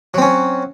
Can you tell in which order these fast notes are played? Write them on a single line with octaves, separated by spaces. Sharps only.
F#3 C4 C#4